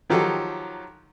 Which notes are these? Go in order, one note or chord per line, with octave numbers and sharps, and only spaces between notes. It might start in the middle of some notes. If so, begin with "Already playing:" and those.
D#3 F3 F#3 D#4 G4 A4